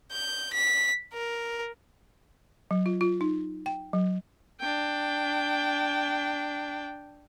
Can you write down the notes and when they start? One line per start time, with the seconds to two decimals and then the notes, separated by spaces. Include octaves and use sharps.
0.12 G6
0.53 B6
1.14 A#4
2.71 F#3
2.86 F4
3.01 F4
3.21 D#4
3.66 G5
3.93 F#3
4.61 D4 G5